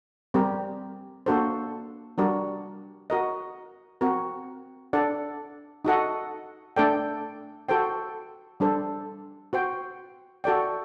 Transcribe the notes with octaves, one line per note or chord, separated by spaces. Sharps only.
G3 C4 G4 A#4
A#3 D4 F#4 A4 C5
G3 D4 F#4 A#4 D5
F#4 A#4 D#5
C4 F#4 A#4
D4 A4 D5 F#5
D#4 F#4 A4 D#5 F#5
A3 D4 A4 D5 G5
F#4 A4 C5 G5
G3 D4 A4 C5
F#4 C5 G5
F#4 A4 D5 G5